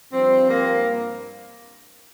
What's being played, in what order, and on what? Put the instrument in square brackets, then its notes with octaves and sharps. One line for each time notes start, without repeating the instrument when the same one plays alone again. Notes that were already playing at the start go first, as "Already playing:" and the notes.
[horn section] G2 F3 C4
A#3